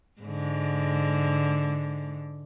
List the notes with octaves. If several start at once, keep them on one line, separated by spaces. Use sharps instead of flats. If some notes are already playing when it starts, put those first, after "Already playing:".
G#2 D3